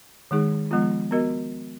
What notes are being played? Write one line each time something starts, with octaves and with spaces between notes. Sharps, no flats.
D#3 G#3 D#4 G#4
F3 G#3 B3 F4
B3 F#4 A#4 D#5